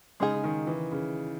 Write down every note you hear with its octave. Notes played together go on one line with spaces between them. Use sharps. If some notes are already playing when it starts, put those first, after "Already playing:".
C#3 G#3 D#4 G#4
C#3
D#3
E3
C#3